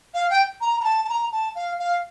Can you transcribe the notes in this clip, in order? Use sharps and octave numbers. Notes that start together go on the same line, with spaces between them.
F5
G5
A#5
A#5
A5
A5
A#5
A5
F5
F5